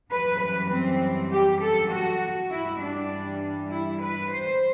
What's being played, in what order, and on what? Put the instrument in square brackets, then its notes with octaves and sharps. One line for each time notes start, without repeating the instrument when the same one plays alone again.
[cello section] F#2 E3 G3 B4
B4
C4
G4
A4
F#4
G2 E3 G3 E4
D4
E4
B4
C5